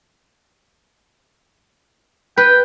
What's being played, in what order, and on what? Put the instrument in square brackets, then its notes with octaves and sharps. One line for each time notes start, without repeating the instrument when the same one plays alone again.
[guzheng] B4 [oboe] G5